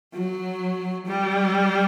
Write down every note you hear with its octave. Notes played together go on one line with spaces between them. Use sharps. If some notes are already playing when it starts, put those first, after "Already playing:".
F#3
G3